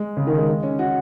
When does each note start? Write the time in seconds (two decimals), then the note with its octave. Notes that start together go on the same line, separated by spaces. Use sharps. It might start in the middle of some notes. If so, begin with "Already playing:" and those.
Already playing: G#3
0.17 C#3
0.27 D#3
0.37 G#3
0.48 G#3
0.63 C#4
0.79 F#4